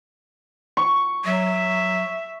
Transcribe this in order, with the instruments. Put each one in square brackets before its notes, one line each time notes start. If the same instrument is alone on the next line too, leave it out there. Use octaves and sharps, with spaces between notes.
[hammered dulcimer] C#6
[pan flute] F#3 [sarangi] E5